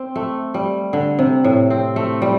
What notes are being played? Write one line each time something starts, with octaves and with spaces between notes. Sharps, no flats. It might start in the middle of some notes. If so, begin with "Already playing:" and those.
Already playing: C4
A3
G3
D3
C3
A2
C4
A3
G3